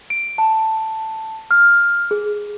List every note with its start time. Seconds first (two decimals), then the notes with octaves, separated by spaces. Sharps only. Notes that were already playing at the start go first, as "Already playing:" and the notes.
0.10 D7
0.38 A5
1.51 F6
2.11 G#4